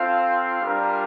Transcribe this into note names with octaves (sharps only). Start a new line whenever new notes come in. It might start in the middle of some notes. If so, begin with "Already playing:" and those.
Already playing: C4 F4 A4 C5 F5
G3 D4 F4 A#4 F5